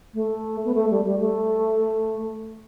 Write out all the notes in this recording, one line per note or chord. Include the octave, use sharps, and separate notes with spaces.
A3
B3
A3
G3
G3
A3